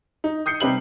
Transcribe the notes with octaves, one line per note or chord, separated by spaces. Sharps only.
D#4
D#6 G6 C7 C#7
C3 G3 B4 F#7